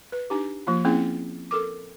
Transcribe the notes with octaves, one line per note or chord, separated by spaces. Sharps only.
B4
D4 D#4 G4
F3 A#3 F4
A#3 C4 C#4 E4 G#4
A4 A#4 D6